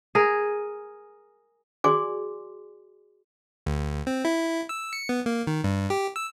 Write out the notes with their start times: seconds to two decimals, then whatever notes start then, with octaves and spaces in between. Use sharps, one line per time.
0.15 G#4 A#4
1.84 F#4 G#4 D5 G#5 C6 D6
3.66 D2
4.07 C4
4.25 E4
4.69 E6
4.93 C#7
5.09 B3
5.26 A#3
5.47 D#3
5.64 G2
5.90 G4
6.16 E6